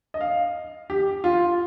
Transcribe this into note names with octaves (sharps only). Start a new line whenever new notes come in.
D#5
F5
G4
F4